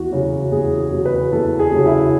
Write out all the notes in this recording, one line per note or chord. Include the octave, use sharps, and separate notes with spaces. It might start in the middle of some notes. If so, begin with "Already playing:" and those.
Already playing: E2 F#4
C#3 F#3
E2 G#4
G#4
C#3 F#3
B4
E2 A4
G#4
C#3 F#3
E4